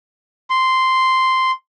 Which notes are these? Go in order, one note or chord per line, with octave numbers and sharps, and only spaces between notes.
C6